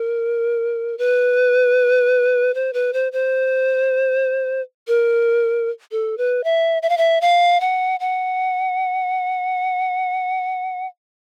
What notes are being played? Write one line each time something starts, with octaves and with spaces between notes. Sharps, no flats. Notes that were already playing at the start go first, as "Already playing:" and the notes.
Already playing: A#4
B4
C5
B4
C5
C5
A#4
A4
B4
E5
E5
F5
E5
F5
F#5
F#5